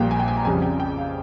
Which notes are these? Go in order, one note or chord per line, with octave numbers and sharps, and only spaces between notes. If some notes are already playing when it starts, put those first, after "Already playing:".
Already playing: A#1 A#2 G3 A#3 G5
G#5
G5
G#5
A#5
F2 C#3 G3 G#5
G5
G5
F5